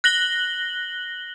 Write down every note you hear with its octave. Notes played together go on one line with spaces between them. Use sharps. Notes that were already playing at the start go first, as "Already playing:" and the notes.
F#6 A#6 F#7 G7